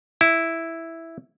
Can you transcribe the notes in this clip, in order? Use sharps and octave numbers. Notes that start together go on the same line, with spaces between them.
E4